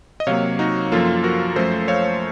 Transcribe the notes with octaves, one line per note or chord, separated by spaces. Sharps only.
D#5
C3 F#3 A#3 C#5 F5
D#4 F#4
F#2 F3 A#3 F4 A4
F#4 A#4
F#2 F3 A3 A4 C5
C#5 F5